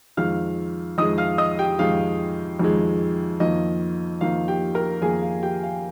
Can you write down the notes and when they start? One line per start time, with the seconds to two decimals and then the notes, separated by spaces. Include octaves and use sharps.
0.17 F2 D#3 G#3 F5 F6
0.98 F2 D#3 G#3 D#5 D#6
1.18 F5 F6
1.38 D#5 D#6
1.59 G4 G5
1.79 F2 D#3 G#3 F5
2.59 F2 D#3 G#3
3.40 F2 D#3 A#3 D#5
4.21 F2 D#3 A#3 F5
4.48 G4 G5
4.75 A#4 A#5
5.02 F2 D#3 A#3 G#4 G#5
5.22 F5
5.43 G4 G5
5.63 F5